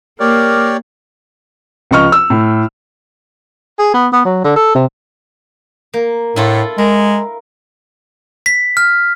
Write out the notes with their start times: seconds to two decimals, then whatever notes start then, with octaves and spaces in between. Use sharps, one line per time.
0.20 A#3 G4 A#4 C#5 D5
1.91 C#2 F3 D#5 C#6 F6
2.12 E6
2.30 A2
3.79 G#4
3.94 B3
4.13 B3
4.25 F#3
4.44 D3
4.56 A4
4.75 C3
5.94 A#3
6.36 A2 E4 F4 A4
6.78 G#3 A#4
8.46 B6
8.77 F6